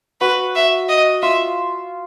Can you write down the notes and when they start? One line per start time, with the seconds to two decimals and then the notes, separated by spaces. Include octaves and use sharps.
0.21 F#4 B4
0.55 E5
0.89 D#5
1.22 F4 E5